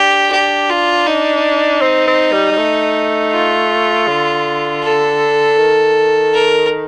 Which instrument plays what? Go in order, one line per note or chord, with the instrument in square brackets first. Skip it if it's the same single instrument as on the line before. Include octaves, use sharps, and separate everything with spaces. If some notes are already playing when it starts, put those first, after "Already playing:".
Already playing: [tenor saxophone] D4 [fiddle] G4
[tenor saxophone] D4 [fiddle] G4
[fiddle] F4
D#4
[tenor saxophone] C4
C4
G3
G3
A3
[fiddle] F4
[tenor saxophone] D3
[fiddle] A4
[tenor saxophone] D#3
[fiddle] A#4